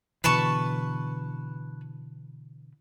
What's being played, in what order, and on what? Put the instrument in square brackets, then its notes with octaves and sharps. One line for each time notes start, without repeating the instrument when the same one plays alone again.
[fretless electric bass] B2 D3 E3 [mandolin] B4 A5 C#6